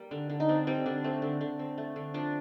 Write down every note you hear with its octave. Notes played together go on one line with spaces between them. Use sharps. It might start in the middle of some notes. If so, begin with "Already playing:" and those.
Already playing: G3 A#3
D3
D3
D#4
C4 D4
G3 C4
D3 D4
A3 C4
D3
D3
C4
A3
D3
F3 D4